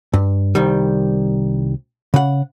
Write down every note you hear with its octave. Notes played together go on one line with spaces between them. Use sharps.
G2
C2 D#3 G3
C#3 F#5